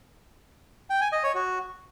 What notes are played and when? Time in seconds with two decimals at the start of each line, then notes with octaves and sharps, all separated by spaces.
0.90 G5
1.01 G#5
1.12 D#5
1.23 C#5
1.35 F#4